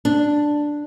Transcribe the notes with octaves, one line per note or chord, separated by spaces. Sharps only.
D4